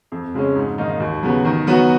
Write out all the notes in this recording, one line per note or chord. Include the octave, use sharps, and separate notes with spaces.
F2
C#3 G#3 C#4
G#2
D#3 A#3 D#4
D#2
C#3 F#3 B3
D#3
F#3 B3 F#4